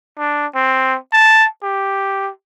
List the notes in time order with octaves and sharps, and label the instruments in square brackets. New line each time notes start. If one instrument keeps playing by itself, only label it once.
[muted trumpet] D4
C4
A5
G4